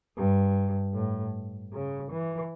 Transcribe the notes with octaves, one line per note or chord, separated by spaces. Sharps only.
G2
A2
C#3
E3